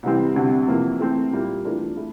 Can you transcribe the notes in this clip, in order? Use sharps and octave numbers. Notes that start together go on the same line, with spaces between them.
C2 C3 E3 G3 C4
D2 C3 G3
F2 C3 E3 A#3
E3 A3 C4
A#2 G3 A#3 E4 A#4
E3 A3 D4 F4 A#4
A3 E4